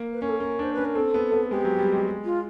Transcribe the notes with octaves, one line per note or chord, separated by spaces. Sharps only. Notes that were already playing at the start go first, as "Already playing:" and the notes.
Already playing: A#3
B4
C#4 A#4
A4
C#4 A#4
D4 C5
C#4 B4
A#4
C4 A4
B3
B3
G#3 G4
F#3
G3
G#3
F4